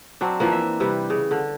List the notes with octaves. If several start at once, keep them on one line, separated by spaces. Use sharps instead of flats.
F#3 C4 D4
E3 F3 A#3
E5
C3 G3 B4
C#3
D3